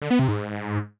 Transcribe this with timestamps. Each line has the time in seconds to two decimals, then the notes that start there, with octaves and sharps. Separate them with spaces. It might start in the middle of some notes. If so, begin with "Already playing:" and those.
0.02 D3
0.10 B3
0.19 C3
0.28 G#2